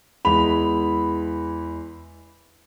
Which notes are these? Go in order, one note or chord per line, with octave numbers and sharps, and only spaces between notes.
E2 E3 G#3 B5 F7